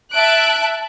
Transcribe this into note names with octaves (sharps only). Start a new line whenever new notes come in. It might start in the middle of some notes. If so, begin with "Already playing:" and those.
E5 A5 F#6 D7